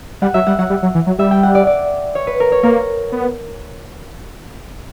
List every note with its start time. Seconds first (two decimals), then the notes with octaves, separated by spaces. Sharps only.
0.22 G3 F#5
0.34 F#3 E5
0.47 G3 F#5
0.58 F#3 F#5
0.70 G3
0.83 F#3
0.95 E3
1.07 F#3
1.18 G3 E5
1.31 G5
1.43 F#5
1.55 D5
1.67 D5
2.15 C#5
2.27 B4
2.40 A#4
2.52 C#5
2.63 A#3 A#4
3.12 B3